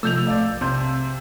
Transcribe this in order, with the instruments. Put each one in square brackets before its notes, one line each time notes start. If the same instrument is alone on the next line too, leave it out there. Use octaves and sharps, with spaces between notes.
[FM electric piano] C3 F3 A3 [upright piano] E6 G6 F7
[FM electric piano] B1 F5 A5 [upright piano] D5
[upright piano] C3 C6 G6